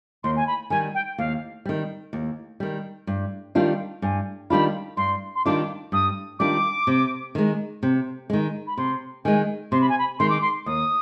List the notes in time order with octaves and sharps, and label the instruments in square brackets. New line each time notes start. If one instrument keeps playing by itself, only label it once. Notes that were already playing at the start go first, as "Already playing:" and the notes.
[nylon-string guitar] D#2 [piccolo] C6
[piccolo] G#5
B5
[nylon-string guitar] D#3 G3 [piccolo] G#5
[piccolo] G5
[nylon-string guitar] D#2 [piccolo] F5
[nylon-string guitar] D#3 G3
D#2
D#3 G3
G2
D#3 G3 D4 F4
[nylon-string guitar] G2 [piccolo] G#5
[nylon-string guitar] D#3 G3 D4 F4 [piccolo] B5
[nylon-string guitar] G2 [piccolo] C6
[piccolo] C6
[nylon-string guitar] D#3 G3 D4 F4 [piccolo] D6
[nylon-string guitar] G2 [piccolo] D#6
[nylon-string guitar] D#3 G3 D4 F4 [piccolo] D6
[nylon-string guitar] C3
D#3 G#3
C3
D#3 G#3
[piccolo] B5
[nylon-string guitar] C3 [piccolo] C6
[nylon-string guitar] D#3 G#3 [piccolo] G#5
[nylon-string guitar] C3 [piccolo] C6
[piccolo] B5
G#5
B5
[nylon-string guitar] D#3 G#3 [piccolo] C6
[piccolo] D6
C6
[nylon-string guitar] D#2 [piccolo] D#6